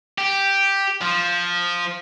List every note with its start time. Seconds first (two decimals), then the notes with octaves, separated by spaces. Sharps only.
0.18 G4
1.02 F3